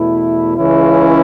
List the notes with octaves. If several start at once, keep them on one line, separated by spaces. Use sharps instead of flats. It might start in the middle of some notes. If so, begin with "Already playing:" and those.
Already playing: E2 B2 A3 E4
C#2 C#3 E3 C#4 E4